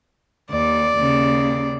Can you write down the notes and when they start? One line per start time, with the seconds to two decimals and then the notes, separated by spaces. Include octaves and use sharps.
0.51 D#2 D5
0.97 D#2 C#3